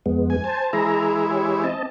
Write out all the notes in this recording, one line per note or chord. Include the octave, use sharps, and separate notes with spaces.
F2 G#3 B3
G#5
C5 A5
E3 G#3 E4 G#4 A#5
G4 C#5
C4 D#5 A5